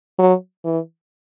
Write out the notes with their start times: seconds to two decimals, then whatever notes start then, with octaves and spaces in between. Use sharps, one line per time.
0.19 F#3
0.64 E3